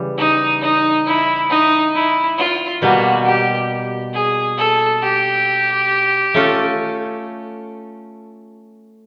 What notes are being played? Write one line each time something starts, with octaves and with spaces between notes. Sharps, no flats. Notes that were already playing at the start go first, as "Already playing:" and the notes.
Already playing: C#3 E3 G3
D#4
D#4
E4
D#4
E4
F4
B2 G3 A#3 F#4
G4
G#4
A4
G4
A3 C#4 F4 A4